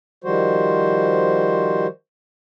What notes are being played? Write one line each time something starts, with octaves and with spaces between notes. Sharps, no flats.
D#3 F3 G3 F#4 C5